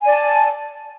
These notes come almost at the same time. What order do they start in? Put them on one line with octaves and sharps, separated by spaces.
G#5 D5 A5